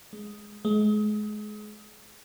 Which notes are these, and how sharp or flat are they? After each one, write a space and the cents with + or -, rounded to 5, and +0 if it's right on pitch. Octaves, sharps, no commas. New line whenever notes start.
G#3 +5
G#3 +30